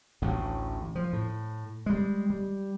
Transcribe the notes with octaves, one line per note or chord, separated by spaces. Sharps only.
A1 D2 A2
F3
A2
G3 G#3
G3